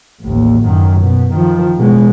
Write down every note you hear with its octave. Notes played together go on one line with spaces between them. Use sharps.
A1 D#2
F#2 D#3
B2
D#3 F3
B2 G#3